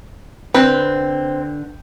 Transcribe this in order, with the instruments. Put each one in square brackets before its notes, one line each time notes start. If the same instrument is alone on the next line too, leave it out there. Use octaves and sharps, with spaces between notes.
[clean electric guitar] D3 [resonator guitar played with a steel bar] C4 [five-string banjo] B4